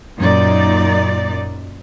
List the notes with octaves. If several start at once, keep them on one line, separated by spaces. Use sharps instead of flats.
F#2 A#2 D#4 D5